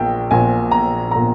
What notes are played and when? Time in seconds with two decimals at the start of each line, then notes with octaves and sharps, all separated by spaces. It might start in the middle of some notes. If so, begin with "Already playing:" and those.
Already playing: A#1 A#2 G5
0.31 A#1 A#2 G#5
0.71 A#5
1.11 A#2 A#5